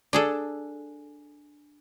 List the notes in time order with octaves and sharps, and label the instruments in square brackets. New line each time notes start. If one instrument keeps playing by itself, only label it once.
[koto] D4 G#4 A4